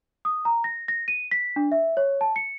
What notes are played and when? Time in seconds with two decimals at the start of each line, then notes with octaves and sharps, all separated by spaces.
0.25 D#6
0.45 A#5
0.64 A#6
0.88 A#6
1.08 D#7
1.31 B6
1.56 D4
1.72 E5
1.97 C#5
2.21 A5
2.36 C#7